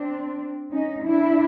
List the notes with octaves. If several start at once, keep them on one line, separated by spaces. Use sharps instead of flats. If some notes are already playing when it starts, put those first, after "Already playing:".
Already playing: C4 D4
C#4 D#4
D4 E4